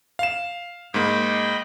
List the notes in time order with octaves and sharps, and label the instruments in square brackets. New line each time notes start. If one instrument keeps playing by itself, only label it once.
[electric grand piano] F5 E7
[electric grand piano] G#2 A#3 [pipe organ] D#5 G5 B5